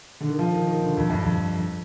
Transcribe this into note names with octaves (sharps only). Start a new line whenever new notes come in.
D3
D#3
F3
D#3
D#3
D3
F2
G2
F2
F2